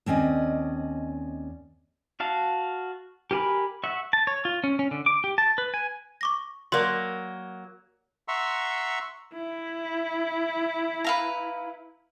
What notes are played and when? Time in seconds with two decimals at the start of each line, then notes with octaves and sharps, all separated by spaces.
0.06 D#2 C4 C#4 D5 D#5
2.20 F#4 F5 A5
3.31 G4 A#4 G#5 B5
3.84 E5 F#5 C#6
4.13 A5
4.27 C#5
4.45 F4
4.64 C#4
4.79 C#4
4.91 D3
5.06 D6
5.24 G4
5.38 A5
5.58 B4
5.74 G#5
6.21 C#6 D6 A#6
6.72 F#3 A#3 A#4 D5 C6
8.28 E5 F#5 A#5 C6 C#6 E6
9.33 E4
11.04 B4 F5 A#5